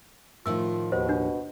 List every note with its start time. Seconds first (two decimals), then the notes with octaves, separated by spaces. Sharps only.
0.46 A2 D#3 F3 F4 E6
0.92 D#2 B2 C5
1.09 D4